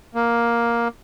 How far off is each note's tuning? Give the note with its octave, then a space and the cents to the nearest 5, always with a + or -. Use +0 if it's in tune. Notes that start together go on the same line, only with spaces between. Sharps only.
A#3 +10